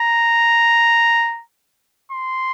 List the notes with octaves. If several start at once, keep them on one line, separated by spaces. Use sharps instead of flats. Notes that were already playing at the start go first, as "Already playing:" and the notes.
Already playing: A#5
C6